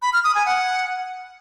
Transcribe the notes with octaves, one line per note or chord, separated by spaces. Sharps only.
B5
F6
D#6
G#5
F#5